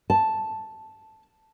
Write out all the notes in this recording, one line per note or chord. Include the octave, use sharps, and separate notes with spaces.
A5